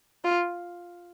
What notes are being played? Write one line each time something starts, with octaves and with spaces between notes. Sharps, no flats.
F4